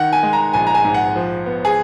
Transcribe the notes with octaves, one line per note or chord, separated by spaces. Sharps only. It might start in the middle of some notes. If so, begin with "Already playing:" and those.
Already playing: D#3 F#5
G#5
G#3
A#5
A#1 G#5
A#5
G#5
G#2
F#5
F3
B3
G#4